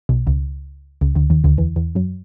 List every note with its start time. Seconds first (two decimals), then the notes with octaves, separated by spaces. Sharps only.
0.09 B1 B2
0.27 C#2 C#3
1.01 C#2 C#3
1.15 D2 D3
1.30 D#2 D#3
1.44 D2 D3
1.57 E2 E3
1.76 E2 E3
1.95 F#2 F#3